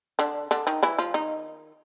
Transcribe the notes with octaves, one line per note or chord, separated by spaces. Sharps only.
D3 D4
D3 D4
D#3 D#4
E3 E4
F3 F4
D#3 D#4